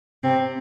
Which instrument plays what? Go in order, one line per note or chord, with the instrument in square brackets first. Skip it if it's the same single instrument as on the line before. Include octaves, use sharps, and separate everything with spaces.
[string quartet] C3 C4